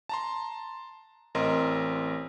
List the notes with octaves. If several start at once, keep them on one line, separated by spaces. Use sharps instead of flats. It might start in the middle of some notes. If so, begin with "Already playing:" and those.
A5 A#5 C6
A1 C4 A#4 D#5 C6